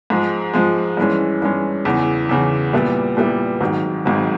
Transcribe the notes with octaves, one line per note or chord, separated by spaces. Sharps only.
G#2 F3 G#3
G#2 F3 G#3
G2 E3 G#3 C#4
G2 E3 G#3 C#4
E2 C#3 E3
E2 C#3 E3
A#2 G3 B3 E4
A#2 G3 B3 E4
G#1 G#2 D#3 F#3
G#1 G#2 D#3 F#3